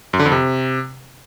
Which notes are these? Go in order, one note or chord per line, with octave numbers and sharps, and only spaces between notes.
F#2
D3
F2
C3